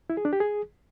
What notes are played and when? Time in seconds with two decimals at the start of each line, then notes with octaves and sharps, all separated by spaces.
0.10 E4
0.17 G#4
0.25 D4
0.33 G4
0.40 G#4